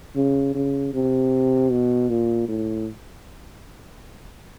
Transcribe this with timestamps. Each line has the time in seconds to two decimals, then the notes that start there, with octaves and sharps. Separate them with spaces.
0.16 C#3
0.55 C#3
0.94 C3
1.71 B2
2.09 A#2
2.49 A2